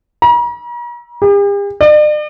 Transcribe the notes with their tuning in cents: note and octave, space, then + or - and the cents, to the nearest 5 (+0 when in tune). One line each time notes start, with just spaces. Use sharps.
A#5 +45
G4 +45
D5 +45